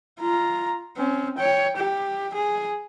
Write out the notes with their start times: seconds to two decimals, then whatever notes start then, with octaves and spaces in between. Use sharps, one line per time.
0.20 F4 A#5
0.97 C4 C#4
1.38 C#5 G5
1.77 G4
2.34 G#4